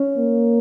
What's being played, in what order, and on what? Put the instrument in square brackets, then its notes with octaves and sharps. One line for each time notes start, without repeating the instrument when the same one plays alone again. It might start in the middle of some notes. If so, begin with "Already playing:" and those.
Already playing: [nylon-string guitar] C#4
[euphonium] A#3